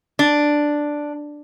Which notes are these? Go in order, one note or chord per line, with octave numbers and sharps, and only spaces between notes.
D4